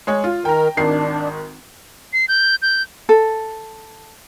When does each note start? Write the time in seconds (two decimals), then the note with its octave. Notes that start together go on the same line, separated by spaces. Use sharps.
0.07 G#3 C#5
0.24 F4
0.45 D#3 A#4 G5 A#5
0.77 G#1 D#3 D4 C7
2.13 C7
2.28 G6
2.62 G6
3.09 A4